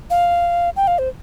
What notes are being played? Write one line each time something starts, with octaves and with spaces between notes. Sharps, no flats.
F5
G5
F5
C5